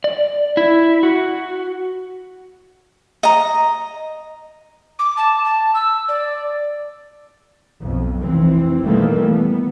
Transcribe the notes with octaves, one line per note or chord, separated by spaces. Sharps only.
D5
E4
F#4
D#5 A#5
D6
A5
A5
E6
D5
B1 F2
F1 E3 C4
B2 D#3 E3 G3 A3 A#3
B3